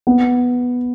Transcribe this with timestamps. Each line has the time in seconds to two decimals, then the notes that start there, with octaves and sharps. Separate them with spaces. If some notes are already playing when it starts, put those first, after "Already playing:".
0.07 B3